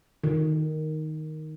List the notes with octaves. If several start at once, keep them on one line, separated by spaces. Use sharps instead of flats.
D#3